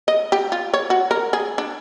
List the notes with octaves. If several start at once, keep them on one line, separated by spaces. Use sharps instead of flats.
D#5
G4
F4
C#5
F#4
A#4
G#4
D4